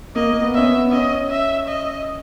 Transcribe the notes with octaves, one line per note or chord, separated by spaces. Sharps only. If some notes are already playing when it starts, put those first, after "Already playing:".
A#3 D#5
A#3
B3
C#4 E5
B3
C#4 D#5
E5
D#5